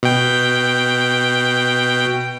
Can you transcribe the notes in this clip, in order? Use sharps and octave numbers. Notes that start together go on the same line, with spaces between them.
B2 G5